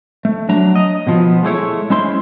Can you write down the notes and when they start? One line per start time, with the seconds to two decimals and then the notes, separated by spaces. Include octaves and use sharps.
0.25 A3
0.49 F#3 D4 A#5
0.76 D#5
1.07 B2 F3 B3
1.43 G#3 A3 E4 C#5
1.90 G#3 C#4 E4 C5 C6